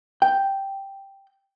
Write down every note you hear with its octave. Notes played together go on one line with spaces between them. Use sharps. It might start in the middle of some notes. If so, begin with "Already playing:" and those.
G5